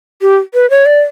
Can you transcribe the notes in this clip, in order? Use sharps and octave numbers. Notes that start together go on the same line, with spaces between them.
G4
B4
C#5
D5